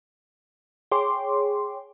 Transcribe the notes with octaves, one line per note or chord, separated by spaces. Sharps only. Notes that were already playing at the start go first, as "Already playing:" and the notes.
G#4 C#5 G5 C6 D6